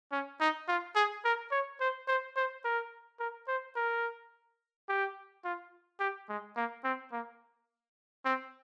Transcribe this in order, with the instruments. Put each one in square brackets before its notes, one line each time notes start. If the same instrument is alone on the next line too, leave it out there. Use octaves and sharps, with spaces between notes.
[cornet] C#4
D#4
F4
G#4
A#4
C#5
C5
C5
C5
A#4
A#4
C5
A#4
G4
F4
G4
G#3
A#3
C4
A#3
C4